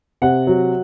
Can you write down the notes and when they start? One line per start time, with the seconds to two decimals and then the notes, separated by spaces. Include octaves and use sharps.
0.22 C3 F#5
0.47 F#3